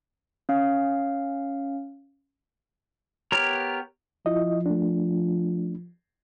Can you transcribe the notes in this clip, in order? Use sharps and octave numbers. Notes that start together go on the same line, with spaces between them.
C#4 F5
B3 G4 A#4 C#5 A#5
F3 E4 F4 D#5
A3 D4